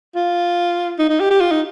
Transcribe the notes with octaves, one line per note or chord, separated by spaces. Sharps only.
F4
D#4
D#4
G4
G4
F4
D#4